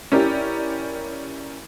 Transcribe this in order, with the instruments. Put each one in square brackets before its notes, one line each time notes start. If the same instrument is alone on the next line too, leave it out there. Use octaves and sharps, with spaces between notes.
[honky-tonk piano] C#4 E4 G4 A#4 D5